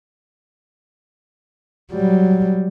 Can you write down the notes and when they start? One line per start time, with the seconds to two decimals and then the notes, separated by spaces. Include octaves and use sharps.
1.93 F#3 G3